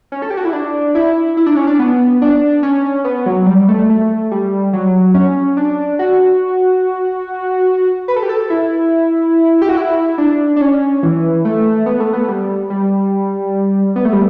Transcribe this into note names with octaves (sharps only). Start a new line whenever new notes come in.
C#4
A4
G4
F#4
E4
D4
E4
E4
D4
C#4
D4
B3
D4
C#4
B3
F#3
G3
A3
A3
G3
F#3
C#4
D4
F#4
B4
A4
G4
A4
E4
G4
F#4
E4
D4
D4
C#4
E3
A3
B3
A3
B3
G3
G3
B3
A3
G3